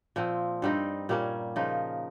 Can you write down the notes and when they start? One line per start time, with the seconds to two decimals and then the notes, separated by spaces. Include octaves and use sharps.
0.16 A#2 F3 C4
0.62 G2 G3 C4 D#4
1.09 A#2 G3 A#3 C#4
1.56 C#3 F3 A#3 D#4